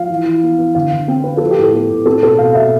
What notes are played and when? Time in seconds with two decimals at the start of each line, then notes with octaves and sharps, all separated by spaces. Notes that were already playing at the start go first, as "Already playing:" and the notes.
Already playing: F3 F5
0.10 E3
0.25 E3
0.43 B3
0.58 B3
0.75 D3 F5
0.92 D3
1.08 C4 G5
1.24 C4 B4
1.37 F3 A4
1.51 G4
1.58 A2
1.64 A4
1.74 B3
1.90 A2
2.06 C4 A4
2.23 B2 A4
2.38 B2 F5
2.55 B2 E5